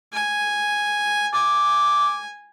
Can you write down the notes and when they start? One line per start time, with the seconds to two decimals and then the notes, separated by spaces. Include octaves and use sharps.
0.13 G#5
1.34 G#5 D6